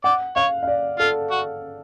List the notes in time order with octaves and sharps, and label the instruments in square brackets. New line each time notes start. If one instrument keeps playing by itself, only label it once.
[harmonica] D5 [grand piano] F#5
[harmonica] C#5 [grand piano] F5
[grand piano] F5
D5
[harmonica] F4 [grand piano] A4
[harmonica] F#4